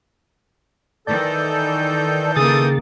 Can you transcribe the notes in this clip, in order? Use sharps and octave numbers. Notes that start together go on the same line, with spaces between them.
D#3 E3 A4 D5 A5 G6
C#3 A#3 G#4 D#6 A6